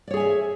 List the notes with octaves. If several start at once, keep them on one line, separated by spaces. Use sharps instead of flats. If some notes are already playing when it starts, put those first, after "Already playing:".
G#4 C#5 D5 E5 G#5